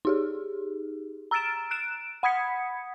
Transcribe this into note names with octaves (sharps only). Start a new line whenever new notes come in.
D#4 G4 G#4
A#5 E6 F6 A6 D7 E7
F#6 D7 E7
F#5 B5 D#6 G#6 B6 C#7